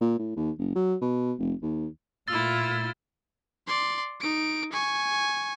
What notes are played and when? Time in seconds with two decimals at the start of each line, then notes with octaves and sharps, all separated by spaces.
0.01 A#2
0.19 A2
0.36 D#2
0.58 F#1
0.75 F#3
1.01 B2
1.39 F1
1.62 D#2
2.28 A#2 A3 E4 F4 E6 A6
3.67 D5 C6
4.21 D#4 D7
4.73 G#5 C#6